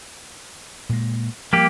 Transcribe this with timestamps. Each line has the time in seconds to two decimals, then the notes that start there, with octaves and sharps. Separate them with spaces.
0.89 A#2 G#3
1.53 F3 G3 A#3 G4